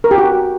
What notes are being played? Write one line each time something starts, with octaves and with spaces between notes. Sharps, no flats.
A#4
G4
F#4